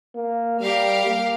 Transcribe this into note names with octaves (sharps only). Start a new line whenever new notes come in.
A#3
G3 G4 A#4 F5
A#3